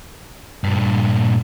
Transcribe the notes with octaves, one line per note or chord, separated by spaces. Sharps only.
G2 A#2